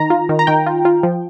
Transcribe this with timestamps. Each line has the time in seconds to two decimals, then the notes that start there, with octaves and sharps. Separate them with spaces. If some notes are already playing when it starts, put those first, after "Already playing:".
Already playing: D#3 A#5
0.10 F4
0.29 D#3
0.39 A#5
0.47 D#3 G5
0.66 F4
0.85 F4
1.03 F3